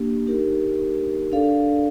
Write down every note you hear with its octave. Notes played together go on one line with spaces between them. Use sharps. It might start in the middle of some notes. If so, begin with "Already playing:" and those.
Already playing: A#3 D4 G4
D#4 G4 A#4
D4 A4 D5 F5